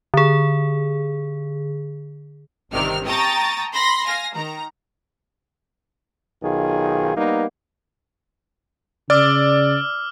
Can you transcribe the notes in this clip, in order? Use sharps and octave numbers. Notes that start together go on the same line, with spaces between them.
D3 G#4
G1 C3 D#3 D4 F6
G5 A5 A#5 C#6 D#6 A6
B5 C6 A#6
F5 G#5 A#6
D#3 A#5
B1 D#3 F4 G#4
G3 A#3 B3 D#4
C#3 D5 D6 E6 F6